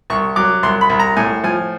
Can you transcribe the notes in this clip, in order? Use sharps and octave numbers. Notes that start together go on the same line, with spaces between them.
C2 C#6
F#3 D6
C2 C6
B5
C2
A#5
A2 G#5
F3 G#5